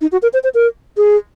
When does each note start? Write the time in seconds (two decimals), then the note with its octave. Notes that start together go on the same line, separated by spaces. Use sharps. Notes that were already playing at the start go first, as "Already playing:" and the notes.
0.01 D#4
0.12 F#4
0.22 A#4
0.33 C5
0.44 C5
0.54 A#4
0.97 G#4